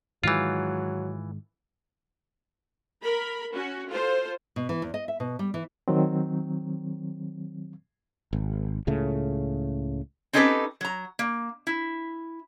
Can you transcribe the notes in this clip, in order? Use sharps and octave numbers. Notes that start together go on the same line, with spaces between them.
G#2 D#3 E3 F#3 G#3 F4
A#4 B5
C#4 F#4
F4 A4 C5
B2
E3
E2
D#5
E5
B2
G3
E3
D#3 F#3 C4
G#1
C#2 A2 C#3 A3
C4 C#4 D#4 G4 A4 B4
F#3 A#5
A#3
E4